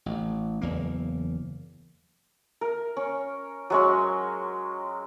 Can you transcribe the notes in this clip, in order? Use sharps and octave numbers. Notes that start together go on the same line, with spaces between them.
A1
F#1 E2 A#3
A#4
C#4
F#3 G#3 C#4